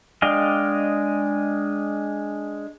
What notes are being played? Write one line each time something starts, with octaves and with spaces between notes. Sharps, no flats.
G#3 D4 D#5 F5 G5